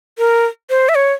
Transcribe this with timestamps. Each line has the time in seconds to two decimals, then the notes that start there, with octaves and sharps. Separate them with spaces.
0.18 A#4
0.70 C5
0.89 E5
0.95 C#5